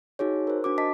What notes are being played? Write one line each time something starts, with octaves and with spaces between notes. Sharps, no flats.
D#4 F#4 G#4 C#5
A#4 C5
D4 F#4 D6
D#5 A5 D6 B6